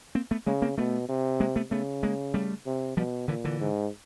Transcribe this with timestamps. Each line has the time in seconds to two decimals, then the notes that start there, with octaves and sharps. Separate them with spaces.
0.15 A#3 C4
0.31 A3 B3
0.47 C#3 G#3 A#3
0.62 A#3 C4
0.78 B2 A3 B3
1.09 C3
1.40 G#3 A#3
1.56 A3 B3
1.71 C#3 A3 B3
2.03 G#3 A#3
2.34 G3 A3
2.66 C3
2.97 B2 F3 G3
3.28 A#2 D3 E3
3.44 D3 E3
3.60 G#2